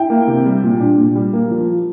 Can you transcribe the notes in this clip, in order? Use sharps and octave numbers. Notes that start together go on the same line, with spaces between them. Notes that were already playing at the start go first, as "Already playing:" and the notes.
Already playing: E4 G5
A#3
C3
G3
A#2
D4
A#2
G3
A#3
F3